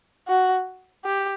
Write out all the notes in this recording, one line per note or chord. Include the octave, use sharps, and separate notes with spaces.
F#4
G4